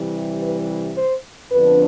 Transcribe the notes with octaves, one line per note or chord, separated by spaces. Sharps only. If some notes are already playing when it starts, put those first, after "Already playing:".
Already playing: C3 E3 G3
B4
C5
F2 D3 F3 B3 D4 B4